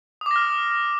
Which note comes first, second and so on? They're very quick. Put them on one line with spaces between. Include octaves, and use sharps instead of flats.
D#6 D6 A#6 F6